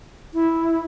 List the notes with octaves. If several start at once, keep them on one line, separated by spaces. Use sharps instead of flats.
E4